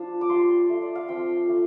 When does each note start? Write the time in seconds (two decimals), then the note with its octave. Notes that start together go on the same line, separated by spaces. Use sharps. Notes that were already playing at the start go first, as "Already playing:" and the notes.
Already playing: F3 D4 F4 A5
0.21 D6
0.29 G3 F4 C6
0.69 A3 F4
0.82 D5
0.95 F5
1.08 F3 C4 F4 G5
1.48 A3 D4 F4